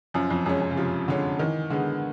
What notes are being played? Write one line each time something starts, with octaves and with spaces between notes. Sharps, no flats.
F#2 F3
F2
F#2 G#3 C#4
F#2
C#3
C3 F3
D3 G#3 C#4
D#3 E3
D3 G#3 B3